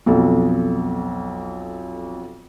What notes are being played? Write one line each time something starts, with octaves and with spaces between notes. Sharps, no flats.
B1 F2 A4